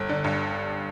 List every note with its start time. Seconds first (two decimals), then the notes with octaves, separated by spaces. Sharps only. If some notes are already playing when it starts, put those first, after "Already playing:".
Already playing: G1
0.09 D3
0.24 G2